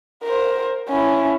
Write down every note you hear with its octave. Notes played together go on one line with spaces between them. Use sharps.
A#4 C5
C#4 E4